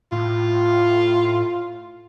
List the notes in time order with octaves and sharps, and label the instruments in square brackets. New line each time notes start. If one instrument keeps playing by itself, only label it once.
[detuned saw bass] A2 [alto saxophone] F4